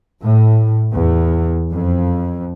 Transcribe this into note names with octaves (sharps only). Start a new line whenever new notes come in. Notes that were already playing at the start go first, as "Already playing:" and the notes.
A2
E2
F2